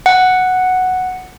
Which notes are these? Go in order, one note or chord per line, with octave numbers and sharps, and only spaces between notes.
F#5